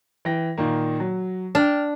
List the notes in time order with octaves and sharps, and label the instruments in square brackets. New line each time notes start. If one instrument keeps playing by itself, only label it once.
[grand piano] E3 G5 A#6
A#2 D#3 A#3
F#3
[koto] D4 [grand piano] G5 F6